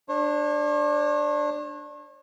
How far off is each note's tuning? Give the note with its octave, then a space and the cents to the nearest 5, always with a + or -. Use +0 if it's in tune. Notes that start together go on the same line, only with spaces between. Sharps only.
D4 +10 C#5 -40